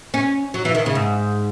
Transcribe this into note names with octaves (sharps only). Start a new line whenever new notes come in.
C#4
F#3
E3
D#3
C#3
G#2